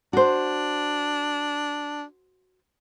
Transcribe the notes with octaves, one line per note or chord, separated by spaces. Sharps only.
D4 F#4 C5